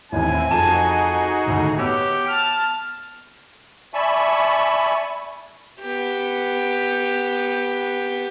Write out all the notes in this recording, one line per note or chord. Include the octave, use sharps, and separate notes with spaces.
A1 D#2 E3 C4 E4 G#5
F2 D#4 F#4 G#4 A5 E7
D2 A2 D#3
B3 G4 C#5 E6
A5 F6
D5 E5 G#5 A5 B5 C#6
B3 G4